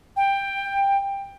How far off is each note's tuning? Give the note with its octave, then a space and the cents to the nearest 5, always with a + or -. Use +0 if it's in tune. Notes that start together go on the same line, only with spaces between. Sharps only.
G5 +15